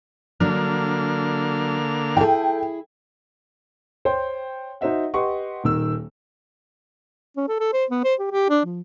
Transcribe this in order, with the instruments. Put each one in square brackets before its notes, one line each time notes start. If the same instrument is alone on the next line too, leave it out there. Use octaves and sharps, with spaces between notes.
[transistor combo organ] D3 A#3 F6 [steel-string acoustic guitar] F#3 D4
[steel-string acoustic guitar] E4 G#4 [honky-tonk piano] A4 G5
[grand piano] C5 C#5 G5 C6
D#4 F#4 C5 D#5 E5 F#5
G4 B4 D#5 F#5 C6 C#6
D#1 D#3 E6
[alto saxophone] C#4
A4
A4
C5
B3
C5
G4
G4
D4
F3